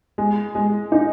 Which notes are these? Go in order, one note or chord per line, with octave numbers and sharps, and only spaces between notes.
G#3
G#3
D#4